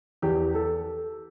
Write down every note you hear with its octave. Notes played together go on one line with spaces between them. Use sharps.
E2 G4
A4